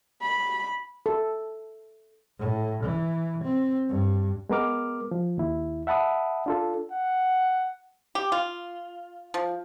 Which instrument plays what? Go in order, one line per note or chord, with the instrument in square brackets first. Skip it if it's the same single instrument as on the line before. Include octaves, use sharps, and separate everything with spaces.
[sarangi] B5
[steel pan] A4
[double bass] A2
E3
C4
G2
[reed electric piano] G#3 B3 A#4 D6 F6
F3
D#2 E4
E5 F#5 A5 B5 D#6
D4 F4 A4
[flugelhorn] F#5
[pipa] G4
F4
F3